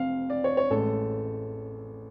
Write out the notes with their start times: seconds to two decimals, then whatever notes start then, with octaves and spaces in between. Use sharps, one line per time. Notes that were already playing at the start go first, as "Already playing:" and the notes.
Already playing: F1 F2 F5
0.30 D5
0.44 C#5
0.57 C#5
0.71 A1 A2 G#3 A4